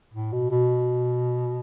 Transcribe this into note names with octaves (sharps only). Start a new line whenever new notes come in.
A2
B2
B2